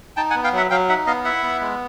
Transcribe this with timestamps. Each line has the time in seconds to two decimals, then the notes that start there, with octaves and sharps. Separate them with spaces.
0.16 D#4 G5 A5
0.30 F#5 G#5
0.35 B3
0.44 F5 G5
0.53 F#3 E5 F#5
0.70 F#3 F5 G5
0.89 D#4 E5 F#5
1.06 B3 D#5 F5
1.24 E4 E5 F#5
1.43 B3
1.61 G#3